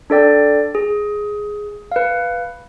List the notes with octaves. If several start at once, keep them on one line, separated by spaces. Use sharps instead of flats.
D4 A4 D5 G5
G#4
B4 F5